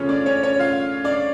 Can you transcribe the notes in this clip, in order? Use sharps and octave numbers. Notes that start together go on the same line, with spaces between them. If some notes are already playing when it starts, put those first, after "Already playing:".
Already playing: C#3 F3 A3 C#4 C#5
D4 D5
C#4 C#5
C#4 C#5
F4 F5
D4 D5